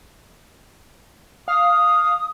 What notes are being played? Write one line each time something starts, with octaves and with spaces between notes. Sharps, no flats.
F5 D#6